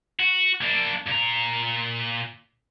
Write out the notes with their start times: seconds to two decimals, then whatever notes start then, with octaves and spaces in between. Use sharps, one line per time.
0.20 F#4
0.61 A#3 D4
1.07 A#2 A#5